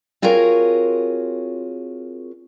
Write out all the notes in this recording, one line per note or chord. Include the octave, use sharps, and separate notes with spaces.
C4 F4 F#4 G#4 A#4 C#5